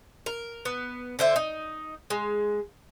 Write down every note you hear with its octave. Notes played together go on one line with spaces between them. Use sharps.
A#4
B3
D3 C5 E5
D#4
G#3